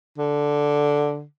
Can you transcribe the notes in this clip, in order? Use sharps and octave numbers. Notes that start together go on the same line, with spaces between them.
D3